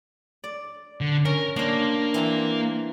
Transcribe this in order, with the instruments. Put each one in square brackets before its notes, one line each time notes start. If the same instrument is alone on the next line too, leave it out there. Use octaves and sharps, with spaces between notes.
[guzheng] D5
[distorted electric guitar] D3
[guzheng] C#4 [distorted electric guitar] A#4
[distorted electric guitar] A#3 [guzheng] D4 C5
[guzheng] E3 C4 A#5